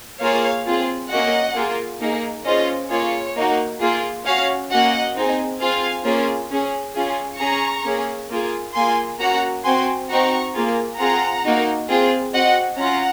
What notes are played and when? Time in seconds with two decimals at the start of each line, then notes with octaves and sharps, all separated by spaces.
0.22 A#3 F4 G#4 C#5 F5
0.66 C4 F4 G#4
1.11 A#3 C#4 F#4 D#5 F#5
1.56 A#3 F4 G#4
2.01 A#3 D#4 G#4
2.46 C#4 F4 G#4 C5 D#5
2.91 A#3 F4 G#4 C#5
3.36 A#3 D#4 F#4
3.81 A#3 F4 G#4
4.25 C#4 F#4 C#5 F5
4.70 A#3 C#4 F#4 D#5 F#5
5.16 C4 D#4 G#4
5.60 C4 F4 G#4 F5 G#5
6.05 A#3 C#4 F4 G#4
6.51 C#4 G#4
6.95 C#4 F4 G#4
7.40 C#4 G#4 A#5 C#6
7.85 A#3 C#4 G#4
8.30 A#3 F4 G#4
8.75 A#3 F4 G#4 G#5 C6
9.20 A#3 C#4 F#4 F#5 A#5
9.64 C4 F#4 G#5 C6
10.10 C4 D#4 F#4 A#5 C#6
10.55 A#3 F4 G#4
10.99 C4 F4 G#4 F#5 A#5
11.45 A#3 D#4 F#4
11.89 C4 F4 G#4
12.34 C4 F#4 D#5 F#5
12.79 C#4 F4 F#5 A#5